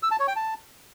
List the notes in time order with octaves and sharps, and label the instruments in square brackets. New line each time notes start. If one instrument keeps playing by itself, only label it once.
[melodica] E6
A5
C#5
G5
A5